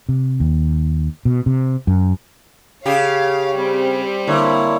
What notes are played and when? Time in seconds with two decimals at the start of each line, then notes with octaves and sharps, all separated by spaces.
0.09 C3
0.40 D#2
1.25 B2
1.46 C3
1.87 F#2
2.86 C#3 G4 C#5 F5
3.56 G3 C4
4.27 D3 A#3 E4 C#5